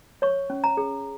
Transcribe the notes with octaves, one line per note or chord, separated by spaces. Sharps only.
C#5 C#6
C#4
A#5
G#4